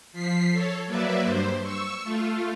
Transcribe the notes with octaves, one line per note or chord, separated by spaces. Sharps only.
F3 B6 C7
A4 C#5
F#3 A#3 B4 D5 E5
G2 C5
C#6 E6
A3 F4